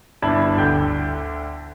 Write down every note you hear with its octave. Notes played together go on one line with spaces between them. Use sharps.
G1 D4 E4 A5 B5 G#6
D2 D3 G5 G6